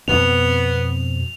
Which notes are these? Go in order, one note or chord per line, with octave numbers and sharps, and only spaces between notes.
F2 B2 B3 C4 F7